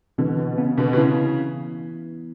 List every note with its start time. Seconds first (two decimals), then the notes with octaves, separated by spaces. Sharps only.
0.18 B2 D3 E3
0.38 B2
0.58 C#3 B3
0.78 B2 D3
0.93 B2
0.97 C#3 E4